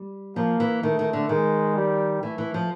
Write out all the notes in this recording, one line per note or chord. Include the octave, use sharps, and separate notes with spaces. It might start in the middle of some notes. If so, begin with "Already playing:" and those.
Already playing: G3
F3 A#3
E3
D#3 A3
D#3
D3
D#3 G#3
G3
E3 A3
E3
F3